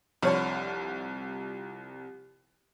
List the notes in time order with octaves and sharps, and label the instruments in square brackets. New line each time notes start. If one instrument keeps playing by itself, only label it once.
[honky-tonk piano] C2 F3 F6 [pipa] D3 C#5 B5